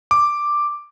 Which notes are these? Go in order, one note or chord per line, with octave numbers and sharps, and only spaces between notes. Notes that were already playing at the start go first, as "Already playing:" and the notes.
D6